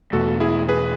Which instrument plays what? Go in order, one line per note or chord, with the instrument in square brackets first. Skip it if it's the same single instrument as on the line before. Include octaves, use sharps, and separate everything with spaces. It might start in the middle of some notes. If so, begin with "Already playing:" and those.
[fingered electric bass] E2 B2 A3 [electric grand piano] F#4 A4
[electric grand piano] E4 G#4
G#4 B4